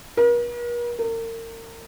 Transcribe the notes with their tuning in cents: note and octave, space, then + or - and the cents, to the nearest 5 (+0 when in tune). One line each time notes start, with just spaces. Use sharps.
A#4 +45
A#4 -35